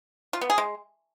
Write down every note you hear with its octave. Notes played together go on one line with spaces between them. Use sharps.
F4
B3
G#4
G#3